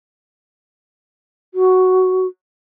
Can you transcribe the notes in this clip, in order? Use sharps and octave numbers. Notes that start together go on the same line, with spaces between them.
F#4